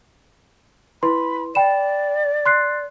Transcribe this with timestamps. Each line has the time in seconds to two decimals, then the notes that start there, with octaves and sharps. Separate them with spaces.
1.03 E4 B4 B5 C6
1.55 D5 G5 B5 E7
2.46 C6 F#6 C7